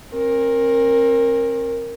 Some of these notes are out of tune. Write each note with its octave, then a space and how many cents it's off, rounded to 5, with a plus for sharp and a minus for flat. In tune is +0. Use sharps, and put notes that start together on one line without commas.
C4 +45 A#4 +0